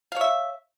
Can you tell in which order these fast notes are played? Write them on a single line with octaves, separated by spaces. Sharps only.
F5 C#5 E5